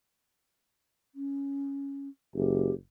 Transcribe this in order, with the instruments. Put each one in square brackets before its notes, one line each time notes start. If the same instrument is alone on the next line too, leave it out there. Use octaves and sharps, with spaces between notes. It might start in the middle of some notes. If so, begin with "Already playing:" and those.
[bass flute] C#4
[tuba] F#1 [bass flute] G4